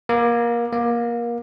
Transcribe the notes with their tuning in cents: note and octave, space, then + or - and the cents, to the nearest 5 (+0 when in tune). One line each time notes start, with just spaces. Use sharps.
A#3 +25
A#3 +25